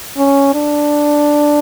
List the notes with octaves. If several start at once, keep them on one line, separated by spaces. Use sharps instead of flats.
C#4
D4